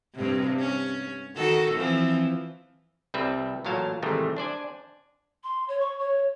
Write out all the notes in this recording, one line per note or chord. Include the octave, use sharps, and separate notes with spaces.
G2 C3
C#4
D#3 F#4 A4
E3 F3 C4
C2 G3 C4 B4 E5
A1 A#2 F#3 F5 A5 A#5
G#2 C3 D#3 E3 G3 A3
D4 C5 D5 G#5
C6
C#5
C#6
C#5